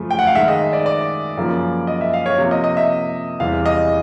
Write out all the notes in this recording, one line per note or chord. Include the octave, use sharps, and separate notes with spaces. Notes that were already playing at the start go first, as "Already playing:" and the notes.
Already playing: F#2 C#3 F3 A3
G5
F#5
F5
G#2 D#3 G#3 E5
D#5
D5
D5
F#2 C#3 F3 A#3
D#5
E5
F5
C#5
C3 F3 A#3
D#5
D#5
E5
E2 C3 E3 G3 F5
D#5